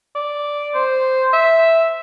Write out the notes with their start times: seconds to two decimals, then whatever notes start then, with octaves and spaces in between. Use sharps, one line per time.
0.16 D5
0.74 C5
1.33 E5